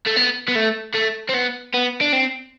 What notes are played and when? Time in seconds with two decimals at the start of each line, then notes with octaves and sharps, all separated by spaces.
0.07 A3
0.17 B3
0.48 B3
0.56 A3
0.95 A3
1.29 C4
1.34 B3
1.74 B3
2.01 D4
2.13 C4